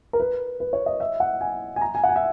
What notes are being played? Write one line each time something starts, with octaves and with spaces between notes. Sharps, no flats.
A#4
B4
B4
C#5
D#5
E5
F#5
G#5
G#5
A#5
G#5
F#5
G#5
E5